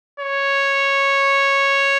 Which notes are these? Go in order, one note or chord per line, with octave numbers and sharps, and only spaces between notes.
C#5